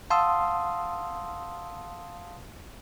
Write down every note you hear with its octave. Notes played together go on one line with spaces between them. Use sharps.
F5 F#5 A5 C6 D#6 E6